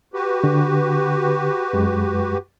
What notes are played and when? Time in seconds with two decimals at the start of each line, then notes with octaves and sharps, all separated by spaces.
0.14 F#4 G4 B4
0.44 D3
1.73 F#2 G#3